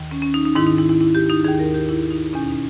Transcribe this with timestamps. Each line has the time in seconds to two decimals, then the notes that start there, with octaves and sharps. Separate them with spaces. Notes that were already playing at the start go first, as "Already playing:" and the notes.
Already playing: D#2 D#3
0.11 C#4
0.22 C#4
0.34 D#4
0.45 D#4
0.55 G#2 D#3 E4
0.67 D#4
0.78 E4
0.89 E4
1.01 E4
1.15 G4
1.30 D#4
1.44 D#2 D#3 G#4
1.59 A#4
1.74 G4
1.89 E4
2.11 D#4
2.33 E2 B2 C#4
2.48 D#4